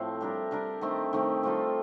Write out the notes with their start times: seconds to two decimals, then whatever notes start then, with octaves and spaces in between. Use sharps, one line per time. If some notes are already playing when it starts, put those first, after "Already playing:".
Already playing: A2 F3 C4
0.21 G3 D4 G4 A#4
0.51 G3 D4 G4 A#4
0.81 D#3 A3 C4 G4
1.13 D#3 A3 C4 G4
1.43 G3 C4 F4 A4